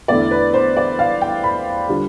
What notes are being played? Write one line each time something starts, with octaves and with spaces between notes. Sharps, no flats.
E2 D3 A3 E4 D5
B4
C5
D5
F5
G5
B5
D3 G3 D4 F4